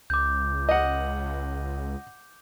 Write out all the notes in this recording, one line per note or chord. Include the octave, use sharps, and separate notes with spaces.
C#2 D6 G6
D#5 F#5